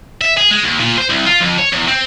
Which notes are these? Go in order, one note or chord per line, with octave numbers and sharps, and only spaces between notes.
E5
G#4
G#3
D#2
A#2
C5
C2
F4
F2
C#5
E2
C4